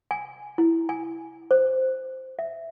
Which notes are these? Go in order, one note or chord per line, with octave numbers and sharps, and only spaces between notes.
G#5
E4
G#5
C5
E5